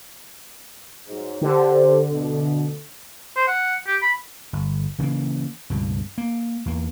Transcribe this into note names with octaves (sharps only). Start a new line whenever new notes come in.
G#2 F#3
D3 G4 C5
D2 B2
C5
F#5
G4
B5
G1
C#3 E3 G#3 A#3
C#2 G2 B2
A#3
E2 A#3